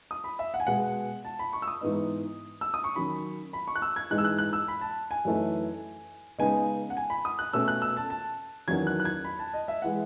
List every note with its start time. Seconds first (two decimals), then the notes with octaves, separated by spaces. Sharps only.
0.11 D#6
0.24 B5
0.39 E5
0.54 F#5
0.60 G#5
0.67 B2 G#3 B3 F#5
1.25 A5
1.39 B5
1.53 C#6
1.62 E6
1.68 D#6
1.81 G#2 E3 B3 D#4
2.61 E6
2.74 D#6
2.84 C#6
2.96 D#3 F#3 C#4 B5
3.53 B5
3.68 C#6
3.75 F#6
3.82 E6
3.96 G#6
4.10 G#2 E3 G#3 D#4 F#6
4.18 E6
4.24 F#6
4.38 F#6
4.53 E6
4.68 B5
4.81 A5
5.11 G#5
5.25 F#2 E3 A3 D#4
6.38 C#3 G#3 B3 D#4 G#5
6.90 F#5
6.97 G#5
7.10 B5
7.25 D#6
7.39 F#6
7.53 B2 A3 C#4 E6
7.68 F#6
7.82 E6
7.97 A5
8.10 A5
8.68 E2 D#3 F#3 C#4 G#6
8.87 F#6
9.00 F#6
9.05 G#6
9.24 B5
9.39 A5
9.53 D#5
9.68 E5
9.82 E3 G#3 F#5